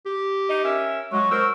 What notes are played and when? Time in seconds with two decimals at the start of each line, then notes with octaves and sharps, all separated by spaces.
0.06 G4
0.50 D#4 D#5
0.64 C#4 A#4 E5
1.13 F#3 G#3 C#6
1.31 F#3 A#4 C5 E6